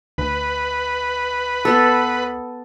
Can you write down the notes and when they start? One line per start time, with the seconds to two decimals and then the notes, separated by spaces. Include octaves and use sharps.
0.18 D2 B4
1.65 B3 A4